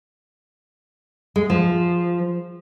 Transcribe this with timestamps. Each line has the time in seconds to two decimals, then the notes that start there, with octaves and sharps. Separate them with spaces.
1.36 G#3
1.50 F3